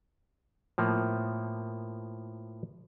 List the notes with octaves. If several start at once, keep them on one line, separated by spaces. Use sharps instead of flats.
A2 F3 A#3 B3